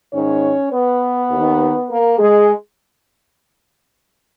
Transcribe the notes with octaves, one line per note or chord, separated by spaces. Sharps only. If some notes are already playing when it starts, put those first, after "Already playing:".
G#2 D#3 C#4 C#5
B3 B4
D#2 D#3
A#3 A#4
G#3 G#4